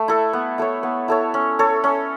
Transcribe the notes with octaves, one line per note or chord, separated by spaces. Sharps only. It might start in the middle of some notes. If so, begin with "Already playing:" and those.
Already playing: A3
E4 A4
B3
E4 A4 C#5
B3
E4 A4 C#5
C#4
A4 C#5
C#4